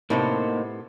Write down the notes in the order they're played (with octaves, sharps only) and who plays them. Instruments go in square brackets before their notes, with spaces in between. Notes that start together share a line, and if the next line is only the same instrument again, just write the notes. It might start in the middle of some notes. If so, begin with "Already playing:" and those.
[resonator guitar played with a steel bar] A2 C3 B3 [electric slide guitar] A#3 D#4 C5